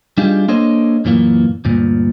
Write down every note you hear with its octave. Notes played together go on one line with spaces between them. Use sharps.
G3 D4 D#4 F4 G4 G#4
A#3 D4 A4 C5 C#5 D#5
F#2 A#2 E3 A#3
D2 G2 A#2